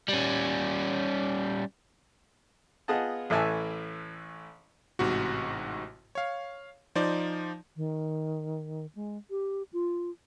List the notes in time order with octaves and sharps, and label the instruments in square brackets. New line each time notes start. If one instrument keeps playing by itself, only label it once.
[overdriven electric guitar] G3 C#4
[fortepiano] B3 F4 G#4 D#5 F#5 A5
A1 A2 E3 E5 G#5 A5
[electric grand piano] A1 G#2 C3 F#4
C#5 F5
F3 D#4 C5 D5
[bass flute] D#3
G#3
G4
F4